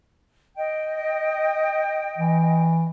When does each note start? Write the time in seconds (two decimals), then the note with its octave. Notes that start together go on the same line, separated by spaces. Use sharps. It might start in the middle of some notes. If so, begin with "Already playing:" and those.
0.57 D#5 G5
2.18 E3